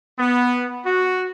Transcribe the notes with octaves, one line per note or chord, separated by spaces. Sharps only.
B3
F#4